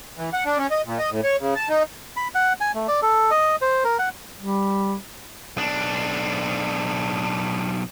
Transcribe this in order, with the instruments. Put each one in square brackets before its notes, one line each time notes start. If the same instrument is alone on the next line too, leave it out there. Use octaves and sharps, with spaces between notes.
[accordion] E3
F#5
D4
C#4
D#5
A#2
D#5
A2
C#5
C#3
A5
D#4
[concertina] B5
F#5
G#5
A3
D5
A4
D#5
C5
A#4
F#5
[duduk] G3
[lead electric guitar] B1 D4